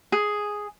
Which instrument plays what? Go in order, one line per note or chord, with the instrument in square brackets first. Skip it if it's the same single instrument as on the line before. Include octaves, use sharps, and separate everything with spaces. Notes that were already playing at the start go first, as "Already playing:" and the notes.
[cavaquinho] G#4